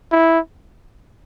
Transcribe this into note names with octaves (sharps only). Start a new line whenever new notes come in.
E4